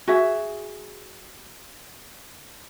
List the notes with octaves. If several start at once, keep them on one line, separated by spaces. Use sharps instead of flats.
F#4 G#4 E5